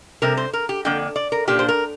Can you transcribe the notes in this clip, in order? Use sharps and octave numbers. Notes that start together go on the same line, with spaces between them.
C3 G3 C4 A#4
C5
A#4
G4
F2 D3 A#3 D4 G5
D5
A#4
A#2 A#3 D4 G4
C5
A#4